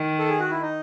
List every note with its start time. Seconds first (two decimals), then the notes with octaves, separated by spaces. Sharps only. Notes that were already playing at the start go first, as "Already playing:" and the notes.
Already playing: D#3
0.19 A4
0.29 G#4
0.40 F#4
0.51 E4
0.61 D#4